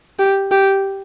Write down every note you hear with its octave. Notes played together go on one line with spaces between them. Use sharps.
G4
G4